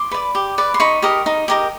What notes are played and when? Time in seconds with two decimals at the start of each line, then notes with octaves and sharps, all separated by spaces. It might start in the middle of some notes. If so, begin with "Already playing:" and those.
Already playing: C6 D6
0.11 B4 D5
0.35 G4
0.58 B4 D5
0.74 C6
0.80 D#4 B5 C#6
1.02 G4 A#4 D#5
1.26 D#4
1.48 G4 A#4 D#5